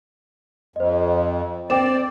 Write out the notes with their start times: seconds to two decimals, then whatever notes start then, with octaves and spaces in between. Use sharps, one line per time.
0.76 F2 C5 D#5
1.70 C4 D5 G5 D6 E7